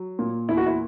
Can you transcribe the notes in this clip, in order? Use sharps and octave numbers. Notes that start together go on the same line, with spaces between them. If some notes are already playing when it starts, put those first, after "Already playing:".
Already playing: F#3
A#2
E2 E4
F#4
E4